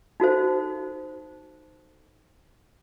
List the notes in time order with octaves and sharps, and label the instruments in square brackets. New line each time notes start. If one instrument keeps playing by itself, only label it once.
[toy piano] D#4 F#4 A4 C5